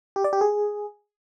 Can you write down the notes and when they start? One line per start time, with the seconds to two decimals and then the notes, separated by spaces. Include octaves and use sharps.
0.16 G4
0.24 D5
0.33 G4
0.41 G#4